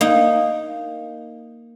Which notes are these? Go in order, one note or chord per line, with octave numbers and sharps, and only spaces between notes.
A#3 D#4